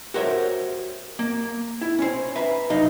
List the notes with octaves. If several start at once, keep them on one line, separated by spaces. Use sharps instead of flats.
F#4 G4 A#4 C5 C#5 E5
A#3
E4
C#4 C5
B4 E5 A#5
C2 F#2 D#4 F5